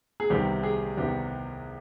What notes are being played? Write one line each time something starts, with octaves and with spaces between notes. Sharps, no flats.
G#4
C2 C3 D#3 G3 B3 G4
G#4
C2 C3 D#3 G3 B3 G4